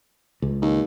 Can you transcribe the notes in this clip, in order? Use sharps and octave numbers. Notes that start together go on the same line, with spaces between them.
C#2
D#2